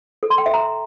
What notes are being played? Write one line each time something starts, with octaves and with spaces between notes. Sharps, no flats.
A4
C6
G5
E5
A#5